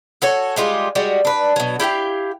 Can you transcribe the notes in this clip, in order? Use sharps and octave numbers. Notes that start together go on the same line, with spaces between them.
F#4 A4 C#5 G#5
G3 G#3 F4 G4
G3 G#3 F#4
D4 B4
B2 F#3
E4 G4 F5 G5